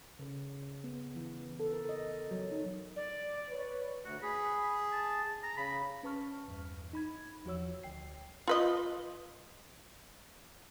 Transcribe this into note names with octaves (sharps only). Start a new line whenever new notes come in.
C#3
B3
E3
A4
A#4
D#5
F#3
D#4
D5
B4 C#5
D2 F#4
G#4 B5
A5
A#5
C#3 B5
C#4 B4 A5 C#6 F6
E2 G2
D#4 B5 G#6
E2 F3 F#4 C#5 E6
D2 G5 C7
F4 B4 D#5